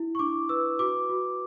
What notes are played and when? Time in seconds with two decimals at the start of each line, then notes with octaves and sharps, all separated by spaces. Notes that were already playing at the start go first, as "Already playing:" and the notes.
Already playing: E4
0.15 C#6
0.19 D4 D6
0.49 B4 E6
0.79 F#4 D6
1.09 F#4